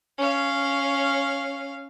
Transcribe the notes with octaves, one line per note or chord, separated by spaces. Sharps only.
C#4 F5